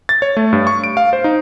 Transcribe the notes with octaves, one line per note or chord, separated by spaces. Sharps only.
A6
C#5
A3
G2
C#6
D7
F5
C5
D#4